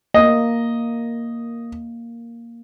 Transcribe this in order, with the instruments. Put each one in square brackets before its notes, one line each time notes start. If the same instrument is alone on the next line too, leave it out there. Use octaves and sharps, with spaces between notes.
[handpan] A#3 [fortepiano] D#5